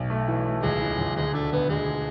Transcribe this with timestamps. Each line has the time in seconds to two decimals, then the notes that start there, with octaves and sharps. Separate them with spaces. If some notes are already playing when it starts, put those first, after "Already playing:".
Already playing: B1
0.10 A3
0.28 E3
0.46 A3
0.63 C#2 G#3
0.81 E3
0.98 C#2
1.16 D2 G#3
1.33 A3 D4
1.52 D2 B3
1.69 D2 G#3